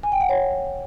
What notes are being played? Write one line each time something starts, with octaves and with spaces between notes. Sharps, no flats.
G#5
G5
F#5
C#5